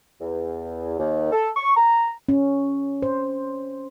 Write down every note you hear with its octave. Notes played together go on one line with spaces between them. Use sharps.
E2
D#2
A4
C#6
A#5
C#4
C5